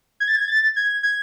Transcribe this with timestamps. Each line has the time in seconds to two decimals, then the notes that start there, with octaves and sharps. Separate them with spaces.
0.20 G#6
0.28 A6
0.36 G#6
0.48 A6
0.76 G#6
1.03 G#6